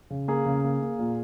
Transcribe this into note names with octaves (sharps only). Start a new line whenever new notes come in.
C#3
A#3 G#4
C#3
A#3
A#3
A#2